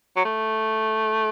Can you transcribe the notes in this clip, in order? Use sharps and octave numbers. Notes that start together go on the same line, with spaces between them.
F#3
A3